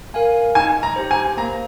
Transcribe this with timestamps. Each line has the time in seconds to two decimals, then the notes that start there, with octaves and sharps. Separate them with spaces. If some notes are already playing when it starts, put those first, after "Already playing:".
0.14 A#4 F5 G#5
0.55 D#4 G#5
0.83 A#5
0.96 G4 C5
1.11 G#5
1.37 A#3 A#5